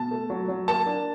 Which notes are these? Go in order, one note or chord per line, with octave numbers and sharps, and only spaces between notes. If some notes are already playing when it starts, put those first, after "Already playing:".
Already playing: B2 A5
A3
F#3
F#3
A#3 A5
D4